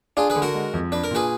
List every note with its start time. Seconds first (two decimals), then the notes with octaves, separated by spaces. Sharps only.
0.17 D4 F4 G#4
0.30 G#4 B4
0.36 D3
0.42 F#4 A#4
0.54 G#3
0.74 F2
0.92 D4 B4
1.04 A#4
1.11 A#2 G#4 B4